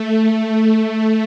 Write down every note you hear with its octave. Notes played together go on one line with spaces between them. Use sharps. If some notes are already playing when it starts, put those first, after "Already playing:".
Already playing: A3
A3